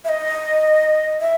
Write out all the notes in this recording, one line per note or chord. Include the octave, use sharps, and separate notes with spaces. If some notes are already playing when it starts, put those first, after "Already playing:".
E5
D#5
E5